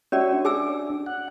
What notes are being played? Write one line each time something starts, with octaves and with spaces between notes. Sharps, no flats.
C#4 F#4 C#5 D5 E5
D4
G#4 G#5 E6
F#5